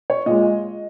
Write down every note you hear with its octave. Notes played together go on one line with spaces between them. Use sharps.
C#5
A#2 G#3 D#5